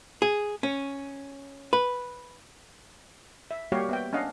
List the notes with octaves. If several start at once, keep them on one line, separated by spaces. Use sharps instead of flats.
G#4
C#4
B4
E5
G3 A#3 F#4 G4 C#5 F5
B3 E5 G5
C#4 D4 D#5 F5 F#5